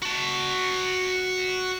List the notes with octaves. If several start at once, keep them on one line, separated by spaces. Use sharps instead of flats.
F#4 A5